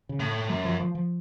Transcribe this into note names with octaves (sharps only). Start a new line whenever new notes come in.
C#3
A2
F#2 F#3
F3
F3
F3